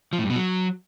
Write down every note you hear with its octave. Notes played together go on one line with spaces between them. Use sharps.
F3
A2
G2
B2
F#3